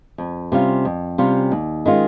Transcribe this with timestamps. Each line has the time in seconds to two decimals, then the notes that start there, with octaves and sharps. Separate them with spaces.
0.18 F2
0.52 C3 G3 C#4 F4
0.85 F2
1.18 C3 G3 C#4 F4
1.52 D#2
1.86 D#3 G#3 C#4 F4